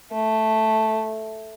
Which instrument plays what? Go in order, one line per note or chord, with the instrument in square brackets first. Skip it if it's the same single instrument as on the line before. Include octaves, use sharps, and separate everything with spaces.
[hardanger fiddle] A3